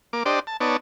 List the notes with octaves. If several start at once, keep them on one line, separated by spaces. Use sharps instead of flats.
A#3 D6
D4 G4 C5 D5 D#5
A5
B3 D#4 C#5 D5 A5